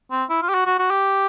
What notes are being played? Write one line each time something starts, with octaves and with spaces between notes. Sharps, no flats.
C4
E4
F4
G4
F#4
F#4
F#4
G4